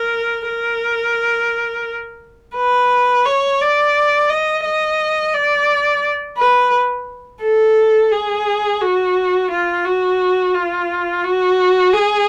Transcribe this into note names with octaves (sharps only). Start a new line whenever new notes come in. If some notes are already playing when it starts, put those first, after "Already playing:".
Already playing: A#4
A#4
B4
C#5
D5
D#5
D#5
D5
B4
A4
G#4
F#4
F4
F#4
F4
F#4
G#4